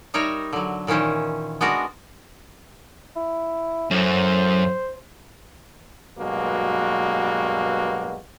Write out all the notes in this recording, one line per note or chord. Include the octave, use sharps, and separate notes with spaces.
G3 D#4 A#4 C#5 E5 A#5
D3 F#3
A#2 D#3 E3 C#4 C5
G#3 B3 D4 F#4 A#4
E4
F#2 A2 C5
G2 B2 F#3 G#3 A#3 F#4